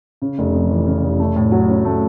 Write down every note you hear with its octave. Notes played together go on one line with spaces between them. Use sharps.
C#3
F1
F2
E3
C#3
F1
A3
A2
F#3
C#4
A3